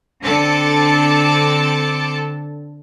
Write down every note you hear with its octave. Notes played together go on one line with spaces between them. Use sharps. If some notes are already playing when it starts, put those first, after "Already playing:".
D3 C4 A4 A5 D6 C#7